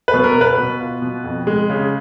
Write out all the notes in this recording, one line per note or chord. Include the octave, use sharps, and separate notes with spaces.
B4
B2
A#4
B2
B4
B2
F4
B2
F2
G#3
C#3